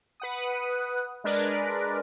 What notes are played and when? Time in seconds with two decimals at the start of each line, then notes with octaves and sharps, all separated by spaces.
0.20 B4 F#5 D#6
1.24 G#3 D4 A#4 B4 D5